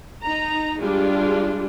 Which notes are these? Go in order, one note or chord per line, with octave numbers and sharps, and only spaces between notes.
D#4 A#5
G3 G#3 D4 F4 G4 G#4